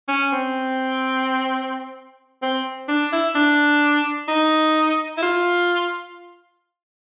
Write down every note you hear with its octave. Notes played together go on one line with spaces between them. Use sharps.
C#4
C4
C4
D4
E4
D4
D#4
E4
F4